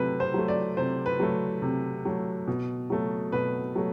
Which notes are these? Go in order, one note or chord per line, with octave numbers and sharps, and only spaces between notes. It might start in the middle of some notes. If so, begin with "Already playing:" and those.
Already playing: C3 F#3 A3 B4
C5
F#3 A3
D5
C3 C5
B4
F#3 A3
C3
F#3 A3
B2
F#3 A3
B2 B4
F#3 A3